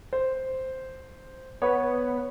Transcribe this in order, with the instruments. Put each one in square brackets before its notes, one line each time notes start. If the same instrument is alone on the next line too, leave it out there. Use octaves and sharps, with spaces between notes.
[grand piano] C5
[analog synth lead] B3 [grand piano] B4 C#5